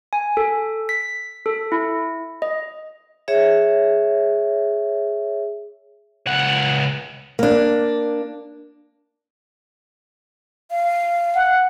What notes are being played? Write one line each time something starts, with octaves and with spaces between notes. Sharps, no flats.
G#5
A4
B6
A4
E4
D#5
G#4 C#5 E5
C#2 F#5
A#3 D4
F5
F#5